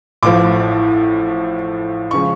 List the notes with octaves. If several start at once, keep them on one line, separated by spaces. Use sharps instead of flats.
A1 A2 F3 D6
C#3 F3 G#3 C#6